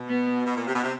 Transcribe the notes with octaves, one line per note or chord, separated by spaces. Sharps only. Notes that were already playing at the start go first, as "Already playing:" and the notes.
Already playing: B2
B3
B2
A#2
C3
B2
C3